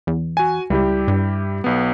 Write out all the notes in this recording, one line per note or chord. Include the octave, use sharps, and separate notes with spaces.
E2
F#4 G#5
C#2 G3 E4 G4
G2
B1 B3